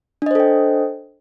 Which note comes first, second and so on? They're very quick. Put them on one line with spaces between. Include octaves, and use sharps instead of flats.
D4 D#5 C5 A4 G5